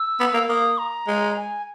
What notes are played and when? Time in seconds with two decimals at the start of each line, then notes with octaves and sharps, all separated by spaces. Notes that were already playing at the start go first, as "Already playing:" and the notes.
Already playing: E6
0.20 B3
0.34 A#3
0.49 A#3 D#6
0.78 A#5
1.07 G#3
1.36 G#5